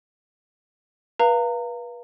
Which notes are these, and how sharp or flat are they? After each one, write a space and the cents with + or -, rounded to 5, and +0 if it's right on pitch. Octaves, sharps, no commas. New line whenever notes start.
B4 -35 F5 -15 A#5 -30